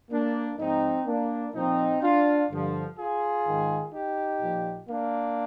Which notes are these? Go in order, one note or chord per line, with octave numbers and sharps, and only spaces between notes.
A#3 D4
G#2 F3 C4 D#4
A#3 D4
A#2 F3 C4 D#4
D4 F4
G2 D3 F3
F4 G#4
G#2 D#3
D#4 G4
A#2 F3
A#3 D4